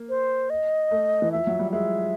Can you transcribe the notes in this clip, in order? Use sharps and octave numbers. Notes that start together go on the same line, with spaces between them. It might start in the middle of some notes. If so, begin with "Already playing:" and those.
Already playing: A#3
C5
D#5
A3
E3
F3 E5
F#3
G3
G#3 E5